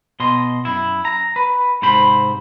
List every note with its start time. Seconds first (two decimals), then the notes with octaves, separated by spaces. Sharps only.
0.20 B2 D#5 C6
0.65 F#2 E4
1.05 A#5
1.36 B4
1.82 G#2 C3 C5 B5